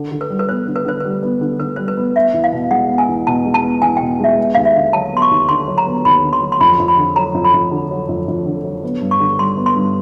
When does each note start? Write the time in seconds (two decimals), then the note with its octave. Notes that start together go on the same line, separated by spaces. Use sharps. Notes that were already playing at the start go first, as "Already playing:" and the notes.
Already playing: D3
0.12 D3
0.21 B4
0.30 G3
0.39 B4
0.49 B3 C5
0.67 D3
0.76 B4
0.85 D3 C5
1.00 G3 B4
1.23 B3
1.41 D3
1.59 D3 B4
1.76 G3 C5
1.88 B4
1.97 B3
2.15 B3 E5
2.34 E2
2.44 F5
2.53 B2
2.71 G#3 F#5
2.90 B3
2.98 G#5
3.08 E2
3.27 B2 A5
3.45 G#3
3.54 A5
3.63 B3
3.82 E2 G#5
3.97 B2 G5
4.20 G#3 E5
4.38 B3
4.55 D#2 F5
4.65 E5
4.74 D3
4.93 F#3 A5
5.12 B3 C6
5.22 C#6
5.31 D#2
5.49 D3 C6
5.68 F#3
5.78 A#5
5.87 B3
6.05 D#2 B5
6.24 D3
6.33 C6
6.42 F#3
6.52 C6
6.61 F2 B5
6.80 F2
6.88 B5
6.98 D3
7.16 F#3 A#5
7.35 F2
7.44 B5
7.54 F2
7.72 D3
7.91 F#3
8.09 F2
8.28 F2
8.46 D3
8.65 F#3
8.83 B3
9.01 G2
9.11 C#6
9.20 D3
9.39 G3 C6
9.57 B3
9.66 C6
9.76 G2